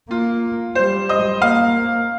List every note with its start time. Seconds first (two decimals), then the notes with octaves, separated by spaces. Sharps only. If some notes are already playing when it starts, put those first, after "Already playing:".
0.10 A#3 F4
0.75 G3 C5
1.09 D#5
1.42 A#3 F5